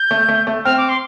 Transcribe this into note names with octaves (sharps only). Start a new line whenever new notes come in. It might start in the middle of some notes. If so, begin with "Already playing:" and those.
Already playing: G6
A3
A3
A3
C4 F6
D6
C6